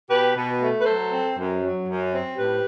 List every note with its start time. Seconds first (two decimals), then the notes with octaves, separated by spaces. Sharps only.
0.09 B2 G4 B4
0.36 B2
0.60 A3
0.80 B4
0.85 F#3 A4 C5
1.10 C4
1.36 F#2
1.60 F#3
1.86 F#2
2.12 C4
2.36 A2 G4 B4